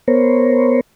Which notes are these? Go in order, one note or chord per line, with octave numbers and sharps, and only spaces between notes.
B3 A#4 C5 C#5